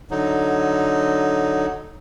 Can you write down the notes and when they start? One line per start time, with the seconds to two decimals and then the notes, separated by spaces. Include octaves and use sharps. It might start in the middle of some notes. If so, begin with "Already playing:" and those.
0.11 D3 F#3 D#4